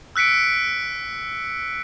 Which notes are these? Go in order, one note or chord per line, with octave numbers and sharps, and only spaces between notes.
E6 F#6 B6 C#7 D7